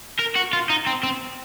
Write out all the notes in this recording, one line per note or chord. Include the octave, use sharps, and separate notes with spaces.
A#4
F#4
F4
D#4
C4
C4